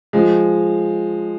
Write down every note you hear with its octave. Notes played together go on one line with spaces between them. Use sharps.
F3 G#3